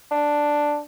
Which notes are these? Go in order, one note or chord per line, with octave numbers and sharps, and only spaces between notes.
D4